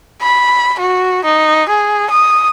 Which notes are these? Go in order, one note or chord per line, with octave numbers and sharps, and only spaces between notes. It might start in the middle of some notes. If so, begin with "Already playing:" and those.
B5
F#4
D#4
G#4
D#6